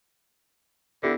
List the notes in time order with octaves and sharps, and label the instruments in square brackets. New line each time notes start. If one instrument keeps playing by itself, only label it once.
[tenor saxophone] D3 [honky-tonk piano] B3 E4 G4